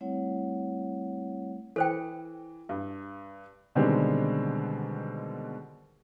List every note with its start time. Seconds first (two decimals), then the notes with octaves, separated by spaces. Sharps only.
0.01 G3 A3 C4 E4 C#5 F#5
1.76 E3 A4 C5 G5
2.69 G2
3.75 B2 D3 D#3 G3 G#3 C4